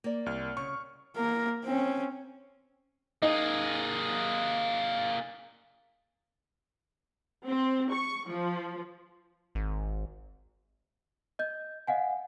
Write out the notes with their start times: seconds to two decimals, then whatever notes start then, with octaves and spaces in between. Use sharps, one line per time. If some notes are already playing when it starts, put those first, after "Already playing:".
0.04 A#3 D5
0.26 C2 F6
0.57 C#3 C#6
1.16 A#3 A#4
1.64 C4 C#4
3.22 A#3 D#4 G#4
7.46 C4
7.92 C#6
8.30 F3
9.55 G#1
11.39 D#5 G6
11.87 D#5 F5 F#5 G#5